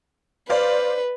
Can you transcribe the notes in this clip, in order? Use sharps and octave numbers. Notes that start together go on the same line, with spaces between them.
B4 C5 D5 F5